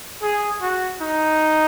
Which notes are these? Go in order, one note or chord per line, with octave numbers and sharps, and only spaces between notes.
G#4
F#4
D#4